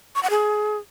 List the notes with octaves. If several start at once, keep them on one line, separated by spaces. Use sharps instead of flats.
C#6
F#5
G#4